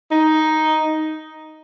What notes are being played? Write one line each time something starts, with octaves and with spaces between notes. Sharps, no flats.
D#4